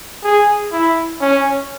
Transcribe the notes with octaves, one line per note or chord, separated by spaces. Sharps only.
G#4
E4
C#4